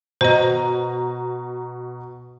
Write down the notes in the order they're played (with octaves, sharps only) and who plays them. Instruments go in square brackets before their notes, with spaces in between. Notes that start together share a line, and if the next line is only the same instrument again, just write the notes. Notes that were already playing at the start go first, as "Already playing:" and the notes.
[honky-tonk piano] B2 A#5 D#7 [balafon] C5 D#5